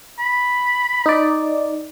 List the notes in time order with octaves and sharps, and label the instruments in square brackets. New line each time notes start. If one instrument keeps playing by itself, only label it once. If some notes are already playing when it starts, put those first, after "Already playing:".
[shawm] B5
[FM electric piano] D#4 D5